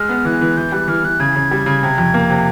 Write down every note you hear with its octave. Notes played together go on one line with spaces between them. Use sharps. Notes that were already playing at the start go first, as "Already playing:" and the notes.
Already playing: G#3 F6
B3
E3 F#6
E3
E3 G6
G3 F#6
E3 F6
E3 F#6
C#3 G#6
C#3
G3
C#3
C3
F2
A#3
C3